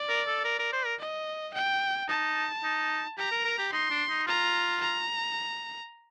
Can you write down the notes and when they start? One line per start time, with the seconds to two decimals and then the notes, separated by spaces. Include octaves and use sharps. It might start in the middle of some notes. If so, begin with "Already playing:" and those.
Already playing: D5
0.09 A#4
0.27 A4
0.44 A#4
0.59 A#4
0.73 C5
0.86 A#4
0.99 D#5
1.54 G5
2.08 D#4 A5
2.64 D#4
3.18 G4 A#5
3.31 A#4
3.45 A#4
3.58 G4
3.72 D#4 C6
3.91 D4
4.09 D#4
4.27 F4 A#5
4.81 A#5